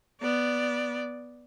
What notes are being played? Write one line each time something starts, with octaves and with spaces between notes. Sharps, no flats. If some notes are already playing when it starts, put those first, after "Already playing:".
B3 D5